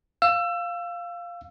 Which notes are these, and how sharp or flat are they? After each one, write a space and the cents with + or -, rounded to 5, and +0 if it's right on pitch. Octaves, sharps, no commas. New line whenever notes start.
F5 +0 E6 +25